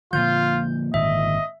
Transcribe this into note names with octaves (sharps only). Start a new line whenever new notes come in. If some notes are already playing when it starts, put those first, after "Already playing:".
A#2 D3 F3 F4 G6
G#1 A#2 D3 D#5 E5